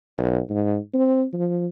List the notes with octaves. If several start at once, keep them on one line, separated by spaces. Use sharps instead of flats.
B1
G#2
C4
F3